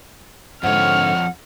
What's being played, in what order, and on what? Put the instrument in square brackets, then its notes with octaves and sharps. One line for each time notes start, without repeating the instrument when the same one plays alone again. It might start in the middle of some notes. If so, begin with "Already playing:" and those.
[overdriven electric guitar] F2 C#5 [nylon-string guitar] G#2 D3 [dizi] F#5 [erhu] F6